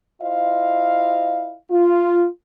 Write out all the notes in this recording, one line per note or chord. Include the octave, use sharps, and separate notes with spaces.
E4 F4 C5 D#5 F5
F4